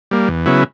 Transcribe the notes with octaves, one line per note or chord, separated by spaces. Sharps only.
G3 A#3
E2
C#3 F#3 B3 E4